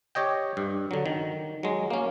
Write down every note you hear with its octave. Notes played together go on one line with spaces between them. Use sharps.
G4 C#5 D#5 G5
G2
D3 F#3
D#3
F#3 G#3
A#3 C#4